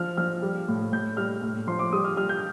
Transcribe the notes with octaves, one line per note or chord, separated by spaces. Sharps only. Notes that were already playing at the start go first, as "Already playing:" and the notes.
Already playing: F3 F6
F3 F6
G3
A2
A2 G6
G3 F6
A2
F3 C6
D6
G3 D#6
F6
G3 F6
G6